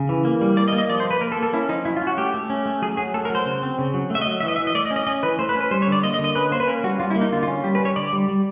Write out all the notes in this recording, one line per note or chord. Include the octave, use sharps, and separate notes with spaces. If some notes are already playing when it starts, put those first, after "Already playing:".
Already playing: C#3
E3
A#3
G3
A#3 D5
D#5
A#3
D#5
F3 D5
C5
F3
B4
A#3 A#4
A4
A#3
A4
C#4 E4
F3 D#4
F#3 E4
F4
C#4
F#4
A3 G4
A3
C#4
A3
F#3 G#4
F#3 G#4
A3 A4
A#4
F#3 C5
C#3
C4
C#3
F#3
A3 E5
D#5
F#3
E5
E3
D#5
E3 E5
D#5
A3 D5
D#5
C#4
D#5
C#4 D#5
E3 B4
A3 C5
B4
C#4
B4
G3 C5
C#5
D3 D5
A#3 D#5
D#5
D3
D#5
C#4 B4
A#3 C5
B4
C#4 A#4
G3 F#4
G3 F4
E4
A#3
D#4
D3 F4
F4
C#4
G3 G4
B4
G3
C#5
D3 D5
G3
G3